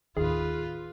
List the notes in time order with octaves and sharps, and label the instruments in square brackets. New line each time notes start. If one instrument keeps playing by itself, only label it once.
[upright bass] D#2 A2 [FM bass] D#3 [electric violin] F4 B4 [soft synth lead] G#4